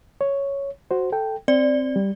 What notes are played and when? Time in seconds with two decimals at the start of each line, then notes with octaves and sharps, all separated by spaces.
0.21 C#5
0.91 F#4 C5
1.12 A4 G5
1.48 C4 D5
1.96 G3